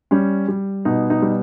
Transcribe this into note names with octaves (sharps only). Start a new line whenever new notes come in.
G3 C#4
G3
B2 D#4
D#4
G3